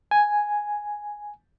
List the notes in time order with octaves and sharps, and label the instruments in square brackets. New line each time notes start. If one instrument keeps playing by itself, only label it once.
[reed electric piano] G#5